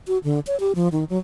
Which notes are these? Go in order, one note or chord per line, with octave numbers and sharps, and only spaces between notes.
F#4
D3
C#5
G4
F3
D#3
F#3